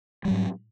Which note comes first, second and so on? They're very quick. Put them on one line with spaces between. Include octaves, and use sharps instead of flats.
G3 F#3 G#2